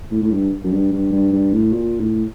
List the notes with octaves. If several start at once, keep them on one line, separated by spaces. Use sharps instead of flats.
A2
A2
G2
F#2
G2
G2
G2
G2
A2
A#2
A2